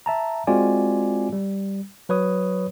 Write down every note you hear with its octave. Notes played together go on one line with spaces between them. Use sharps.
E5 A5 A#5
G#3 C4 F4 F#4 D5 G#5
G3
F#3 B4 C#5 D#6